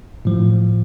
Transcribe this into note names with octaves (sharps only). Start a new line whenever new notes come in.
A2 F3